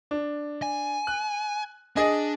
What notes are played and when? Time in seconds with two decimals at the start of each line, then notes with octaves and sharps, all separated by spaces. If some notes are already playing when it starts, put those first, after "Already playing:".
0.11 D4
0.62 G#5
1.07 F#6
1.96 D4 G#4 D#5 G#5